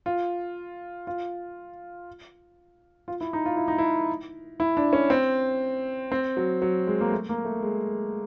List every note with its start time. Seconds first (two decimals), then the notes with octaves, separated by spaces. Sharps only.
0.06 F4
1.07 F4
3.08 F4
3.21 E4
3.33 D#4
3.46 F4
3.57 E4
3.68 D#4
3.78 E4
4.60 E4
4.77 D4
4.93 C#4
5.10 C4
6.12 C4
6.37 F#3
6.62 F#3
6.87 G#3
7.01 A#3
7.12 A3
7.29 A#3
7.45 A3
7.62 G#3